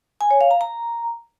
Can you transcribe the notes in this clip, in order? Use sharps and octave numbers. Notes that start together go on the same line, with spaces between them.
G#5
C#5
F5
A#5
A#5